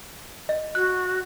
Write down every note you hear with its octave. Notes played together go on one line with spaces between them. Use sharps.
D#5
F#4 F#6